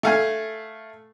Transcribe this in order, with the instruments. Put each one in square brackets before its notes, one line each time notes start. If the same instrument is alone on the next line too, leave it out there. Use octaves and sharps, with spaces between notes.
[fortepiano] A3 F5 G#5